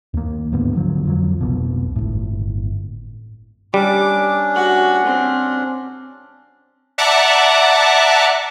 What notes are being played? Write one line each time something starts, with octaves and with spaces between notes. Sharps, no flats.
D#2 A#3
D#2 G#2 D3 B3
D1 D3 F3 F#3
F2 F3 F#3
F1 C2 B2
G1 A2
G3 C#4 D4 D6
F#4 F#5
C4
D5 E5 F#5 A5 A#5 D6